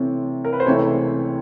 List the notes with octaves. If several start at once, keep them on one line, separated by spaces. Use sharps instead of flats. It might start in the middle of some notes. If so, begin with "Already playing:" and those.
Already playing: C3 E3 A3 C4 C#5
A#4
B4
C5
C#2 C3 E3 A3 C#5